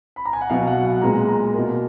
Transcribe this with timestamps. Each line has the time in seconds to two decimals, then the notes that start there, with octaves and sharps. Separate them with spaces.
0.16 B5
0.25 A#5
0.33 G#5
0.41 F#5
0.50 B2 F#3 B3 F5
0.67 F#5
0.85 F#5
1.02 A#2 G#3 B3 A#5
1.28 A#5
1.54 B2 A#3